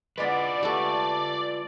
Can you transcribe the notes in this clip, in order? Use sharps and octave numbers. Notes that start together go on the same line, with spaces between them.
G#3 B3 E4 F4 B4 D5
A3 F#4 G4 A4